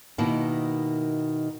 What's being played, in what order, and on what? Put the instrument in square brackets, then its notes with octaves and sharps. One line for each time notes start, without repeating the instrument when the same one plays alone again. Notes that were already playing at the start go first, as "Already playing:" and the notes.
[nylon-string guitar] B2 D#3 A#3 D#4 E4